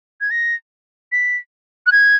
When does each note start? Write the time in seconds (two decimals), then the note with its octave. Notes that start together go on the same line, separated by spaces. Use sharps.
0.21 G#6
0.31 A#6
1.12 B6
1.86 F#6
1.92 G#6